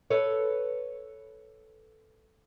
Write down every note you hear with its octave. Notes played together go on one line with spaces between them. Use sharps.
A4 B4 C#5